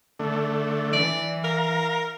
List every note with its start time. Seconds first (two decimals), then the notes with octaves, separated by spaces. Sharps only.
0.19 D3 A3
0.93 E3 D5
1.44 A#4 F5 A#5